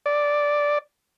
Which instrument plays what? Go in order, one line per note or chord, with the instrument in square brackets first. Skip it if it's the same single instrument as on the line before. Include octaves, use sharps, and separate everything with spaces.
[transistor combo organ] D5